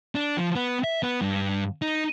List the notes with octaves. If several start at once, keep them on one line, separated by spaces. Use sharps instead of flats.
D4
F3
B3
E5
B3
G2
D#4